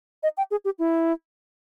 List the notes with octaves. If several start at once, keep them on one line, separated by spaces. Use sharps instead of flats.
D#5
G5
G#4
G4
E4